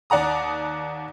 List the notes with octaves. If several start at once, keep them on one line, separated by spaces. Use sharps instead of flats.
D#2 D5 F#5 A#5 D#6